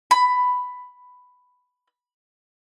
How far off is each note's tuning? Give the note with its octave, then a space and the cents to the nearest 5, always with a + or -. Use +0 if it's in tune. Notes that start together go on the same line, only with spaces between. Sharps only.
B5 +10